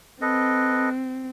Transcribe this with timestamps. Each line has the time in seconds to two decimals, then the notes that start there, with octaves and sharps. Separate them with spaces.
0.22 C4 A4 B4 D#5